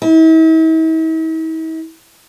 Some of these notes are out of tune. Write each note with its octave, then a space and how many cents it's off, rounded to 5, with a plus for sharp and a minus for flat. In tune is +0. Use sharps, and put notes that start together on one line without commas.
E4 -45